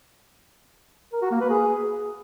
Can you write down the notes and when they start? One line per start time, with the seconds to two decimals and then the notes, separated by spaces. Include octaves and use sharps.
1.13 A#4
1.22 F#4
1.31 A#3
1.41 B4
1.50 G#4